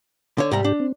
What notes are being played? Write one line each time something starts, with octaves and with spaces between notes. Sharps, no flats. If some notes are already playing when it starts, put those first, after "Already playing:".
D3 C#5
C2 G#2 G3 G4 A#5
D4
C4